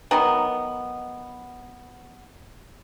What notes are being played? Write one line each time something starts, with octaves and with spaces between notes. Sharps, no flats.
D#3 F#3 B3